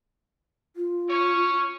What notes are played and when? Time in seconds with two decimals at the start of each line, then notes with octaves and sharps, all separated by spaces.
0.76 F4
1.09 C#4 C#5